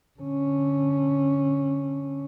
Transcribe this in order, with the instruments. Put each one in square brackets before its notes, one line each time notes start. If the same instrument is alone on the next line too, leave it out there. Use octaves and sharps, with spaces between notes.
[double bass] D3 C#4